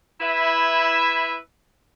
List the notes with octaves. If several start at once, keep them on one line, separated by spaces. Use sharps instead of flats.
E4 B4 E5